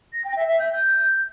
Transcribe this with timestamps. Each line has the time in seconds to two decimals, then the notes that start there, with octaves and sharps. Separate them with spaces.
0.12 A#6
0.24 G5
0.36 E5
0.47 E5
0.59 G6